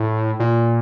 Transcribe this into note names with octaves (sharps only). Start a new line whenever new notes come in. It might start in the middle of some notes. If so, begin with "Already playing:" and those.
Already playing: A2
A#2